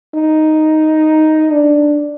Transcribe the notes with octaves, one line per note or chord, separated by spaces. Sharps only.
D#4
D4